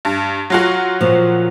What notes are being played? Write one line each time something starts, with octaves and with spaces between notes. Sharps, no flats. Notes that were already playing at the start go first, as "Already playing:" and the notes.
G2
F#3 F4 F#4
A#2 F3